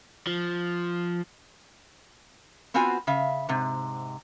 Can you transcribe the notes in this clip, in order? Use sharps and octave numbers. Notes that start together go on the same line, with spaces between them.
F3
B3 C4 F4 F#4 G#5
C#3 E5 F5
G#2 C3